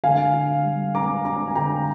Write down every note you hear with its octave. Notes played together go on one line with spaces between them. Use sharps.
D3 F5 G#5
D3
G3
D4 A#5 D6
D4 A#5 D6
G#5
D3 G5 A#5